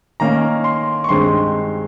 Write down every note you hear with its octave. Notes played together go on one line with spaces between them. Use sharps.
D#3 A#3 C#4 A#5
C6
C#6
G2 D#3 G#3 C4 C6